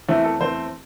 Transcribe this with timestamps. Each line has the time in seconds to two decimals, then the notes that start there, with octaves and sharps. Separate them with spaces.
0.09 E2 E3 A3 C4 E4
0.24 A4
0.40 E2 E3 A3 C4 C5